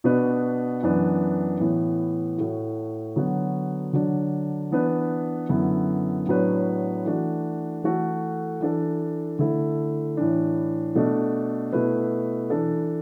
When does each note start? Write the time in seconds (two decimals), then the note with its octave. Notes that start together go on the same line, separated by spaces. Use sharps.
0.04 B2 B3 D4 F#4 B4
0.83 F#2 E3 B3 D4 B4
1.60 A2 E3 B3
2.38 A2 A3 F#4
3.16 D3 F#3 B3 F#4
3.93 D3 F#3 D4
4.71 E3 B3 D4 B4
5.49 F#2 D3 B3 E4
6.27 A2 F#3 B3 D4 B4
7.05 E3 A3 D4 F#4
7.83 E3 A3 F#4 A4
8.60 E3 D4 A4
9.39 D3 A3 E4 A4
10.17 A2 E3 D4
10.95 B2 A3 D4 A4
11.72 B2 A3 E4 B4
12.50 E3 D4 A4